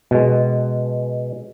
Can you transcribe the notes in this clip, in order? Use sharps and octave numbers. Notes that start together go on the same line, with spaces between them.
B2 G#3